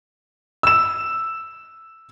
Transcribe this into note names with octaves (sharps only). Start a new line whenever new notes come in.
E6 E7